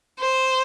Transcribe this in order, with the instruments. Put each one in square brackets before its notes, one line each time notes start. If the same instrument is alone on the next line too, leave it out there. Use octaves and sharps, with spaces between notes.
[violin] C5